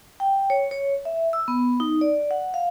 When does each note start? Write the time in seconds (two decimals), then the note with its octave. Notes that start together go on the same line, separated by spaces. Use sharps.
0.20 G5
0.50 C#5
0.71 C#5
1.05 E5
1.33 E6
1.48 B3
1.80 D#4
2.01 D5
2.31 F#5
2.54 F5